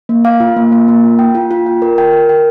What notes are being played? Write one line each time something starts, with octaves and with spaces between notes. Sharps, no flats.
A#3
F5
F4
A#3
A#3
A#3
F4
G5
F4
F4
G5
A#4
G5
A#4
G5